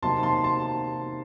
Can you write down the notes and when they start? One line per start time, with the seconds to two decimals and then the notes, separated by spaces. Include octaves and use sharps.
0.02 C3 F#3 A#3 D#4 A5 C6
0.23 A5 C6
0.44 A5 C6